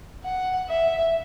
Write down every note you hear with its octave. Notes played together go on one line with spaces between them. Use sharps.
F#5
E5